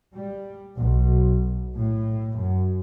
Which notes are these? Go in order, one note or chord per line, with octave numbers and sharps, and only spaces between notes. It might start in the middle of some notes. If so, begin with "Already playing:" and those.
G3
B1
A2
F#2